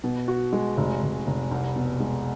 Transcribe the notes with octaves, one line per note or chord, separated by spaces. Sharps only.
B2
F#4
G#3
F1
F1
F1
C2
B2
G#3